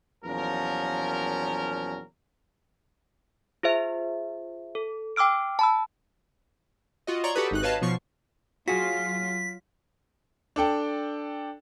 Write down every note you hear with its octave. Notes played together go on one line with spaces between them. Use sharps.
E2 A#2 F3 F#3 C#4 A#4
F4 G#4 C5 E5
A4
G5 D6 E6 F6 D7
A5 B5 E6
F4 F#4 D#5
C#5 D5 A#5 C6 C#6
F#4 G4 A4 B4 D#6
G#1 D#4 F#6
B4 C#5 D#5 F5 A5
B2 F3 C#6 C7
F#3 F4 F#4 G#4 B6
D4 A4 G5